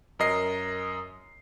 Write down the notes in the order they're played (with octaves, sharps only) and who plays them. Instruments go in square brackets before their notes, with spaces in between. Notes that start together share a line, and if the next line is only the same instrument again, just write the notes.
[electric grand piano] F#2 A#4 D#5 C7